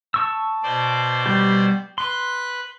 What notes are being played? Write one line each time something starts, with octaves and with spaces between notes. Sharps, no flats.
A5 C#6 E6
B2 C5 D5
G3 G4
B4 C6 F#6